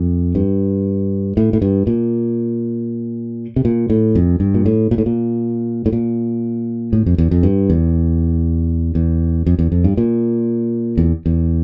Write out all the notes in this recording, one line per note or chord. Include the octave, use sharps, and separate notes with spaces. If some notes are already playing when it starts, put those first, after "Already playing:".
Already playing: F2
G2
A2
A2
G2
A#2
C3
A#2
A2
F2
G2
A#2
A2
A#2
A2
A#2
A2
A#2
A2
F2
E2
F2
G2
E2
E2
F2
E2
F2
G2
A#2
E2
E2